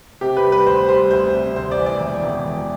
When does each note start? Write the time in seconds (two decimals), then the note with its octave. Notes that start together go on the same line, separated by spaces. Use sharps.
0.21 C3 G4
0.37 B4
0.44 G3
0.52 B4
0.67 D2 C5
0.89 G3 C5
1.11 D2 C5
1.34 C3
1.56 D2 C5
1.71 D5
1.79 E3
1.86 D5
2.00 E1
2.23 E1
2.45 E1